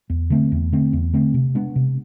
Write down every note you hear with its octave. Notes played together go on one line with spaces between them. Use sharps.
E2
D3 A3 C4
E2
D3 A3 C4
E2
D3 A3 C4
C3
G#3 B3 D4
C3